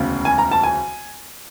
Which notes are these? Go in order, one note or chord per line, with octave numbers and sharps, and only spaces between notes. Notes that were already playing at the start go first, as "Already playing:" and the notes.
Already playing: E1 D2 C#3
G#5
A#5
A5
G#5